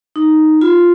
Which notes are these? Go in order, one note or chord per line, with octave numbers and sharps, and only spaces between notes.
D#4
F4